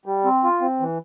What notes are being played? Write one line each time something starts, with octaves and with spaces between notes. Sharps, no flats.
G3
C4
F4
C4
E3